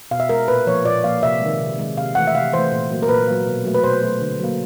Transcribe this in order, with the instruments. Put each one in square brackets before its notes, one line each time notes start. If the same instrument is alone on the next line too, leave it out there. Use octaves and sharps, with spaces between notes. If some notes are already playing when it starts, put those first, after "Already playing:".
[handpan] B2 F5
E5
G#3 A#4
A#2 B4
F3 A#3 C#5
A#2 D5
F3 A#3 F5
C3 E5
D#3 G#3
C3
D#3 G#3
C3 F5
E3 A3 F#5
E5
C3 F5
E3 A3 C5
A#2
F#3 A#3
A#4
A#2 B4
F#3 A#3
B2
F#3 A3
B4
B2 C5
F#3 A3
D3
F#3 A#3